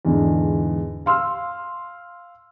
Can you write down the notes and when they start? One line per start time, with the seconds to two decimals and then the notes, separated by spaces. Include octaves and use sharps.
0.05 E2 G#2 D3
1.06 F5 C6 E6 F6